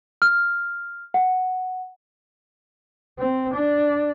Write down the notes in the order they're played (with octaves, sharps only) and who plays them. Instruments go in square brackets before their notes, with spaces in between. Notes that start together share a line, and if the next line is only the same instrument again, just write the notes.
[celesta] F6
F#5
[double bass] C4
D4